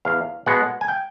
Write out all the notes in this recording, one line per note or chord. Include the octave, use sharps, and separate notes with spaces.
E2 F5
B2 G#3 B3 F#5
G#5
G5